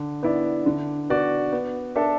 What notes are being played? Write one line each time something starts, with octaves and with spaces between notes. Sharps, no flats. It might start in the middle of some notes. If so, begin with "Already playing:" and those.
Already playing: D3
B3 E4 D5
D3
B3 F#4 D5
B3
D4 A4 E5